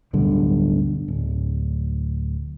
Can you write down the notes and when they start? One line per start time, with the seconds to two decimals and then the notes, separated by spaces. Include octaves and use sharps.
0.13 D1 B1 G2 D3
1.08 D1